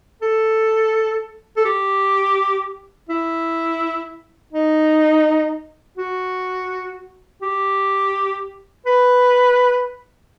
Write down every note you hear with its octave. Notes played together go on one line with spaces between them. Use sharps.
A4
A4
G4
E4
D#4
F#4
G4
B4